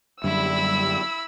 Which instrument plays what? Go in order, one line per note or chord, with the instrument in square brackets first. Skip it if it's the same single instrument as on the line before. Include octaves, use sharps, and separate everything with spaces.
[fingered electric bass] F#2 D3 [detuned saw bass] G3 [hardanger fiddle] E4 B5 [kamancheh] E6